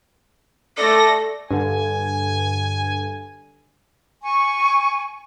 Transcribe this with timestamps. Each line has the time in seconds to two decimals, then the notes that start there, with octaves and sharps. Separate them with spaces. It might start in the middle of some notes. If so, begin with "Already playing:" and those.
0.78 A3 A4 D5 A#6
1.51 G2 D3 G#5
4.22 G#5 C#6